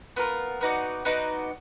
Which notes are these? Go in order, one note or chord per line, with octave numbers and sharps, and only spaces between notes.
B3 F4 A#4
B3 D#4 F#4 D5
B3 D#4 F#4 D5